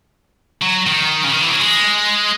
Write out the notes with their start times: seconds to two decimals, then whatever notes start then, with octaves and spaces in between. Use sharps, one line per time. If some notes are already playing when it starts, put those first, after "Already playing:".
0.62 F#3
0.87 D#3
1.24 C#3
1.32 D#3
1.42 E3
1.51 F#3
1.61 G#3